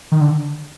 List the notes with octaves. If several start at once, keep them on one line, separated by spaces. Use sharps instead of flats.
D#3
D3